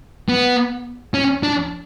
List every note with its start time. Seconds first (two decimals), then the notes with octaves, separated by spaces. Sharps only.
0.29 B3
1.14 C#4
1.43 D4